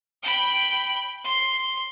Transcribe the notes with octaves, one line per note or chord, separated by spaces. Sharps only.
G5 B5
C6